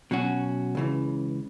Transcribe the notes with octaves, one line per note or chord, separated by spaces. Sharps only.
B2 F#3 C#4 F#4
C#2 C#3 E3